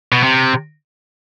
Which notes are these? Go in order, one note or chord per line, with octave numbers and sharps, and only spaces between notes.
B2
C3